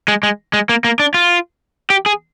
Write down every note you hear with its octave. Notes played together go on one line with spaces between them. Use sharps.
G#3
G#3
G#3
A#3
A#3
D4
F4
G4
G#4